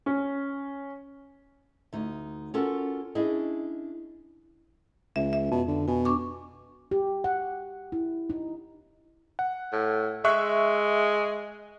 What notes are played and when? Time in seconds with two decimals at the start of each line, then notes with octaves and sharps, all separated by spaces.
0.06 C#4
1.93 D2 D#4
2.54 C#4 F4 F#4 A4 A#4
3.15 C#4 D4 E4 G#4 D#5
5.16 C#2 E5
5.33 E5
5.52 F2 B2
5.68 D3
5.88 B2 G#5
6.05 D4 C#6 D6
6.91 G4
7.24 F#5
7.92 E4
8.30 D#4
9.39 F#5
9.73 A2
10.25 G#3 E5 C#6 F#6